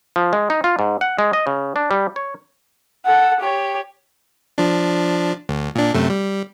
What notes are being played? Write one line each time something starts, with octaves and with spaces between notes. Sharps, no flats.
F3
G#3
D#4
F4
G#2
F#5
G#3
D#5
C#3
D4
G3
C#5
A4 F#5
G4 C#5
F3 D4
D2
A#2 D4
F#2 C3 A3
G3